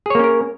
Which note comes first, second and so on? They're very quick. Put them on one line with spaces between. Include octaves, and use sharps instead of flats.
G#4 C#5 A#3 C#4 A#4